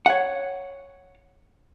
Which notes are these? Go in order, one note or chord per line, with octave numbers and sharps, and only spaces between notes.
C#5 F#5